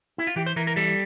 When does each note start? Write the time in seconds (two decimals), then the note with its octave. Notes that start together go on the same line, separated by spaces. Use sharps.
0.18 E4
0.27 F4
0.36 E3 G4
0.46 C5
0.56 E3 A#4
0.67 A#4
0.76 G3 A4